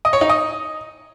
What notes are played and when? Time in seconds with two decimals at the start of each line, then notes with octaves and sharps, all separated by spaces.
0.05 D#5
0.13 C#5
0.21 D#4
0.29 D#5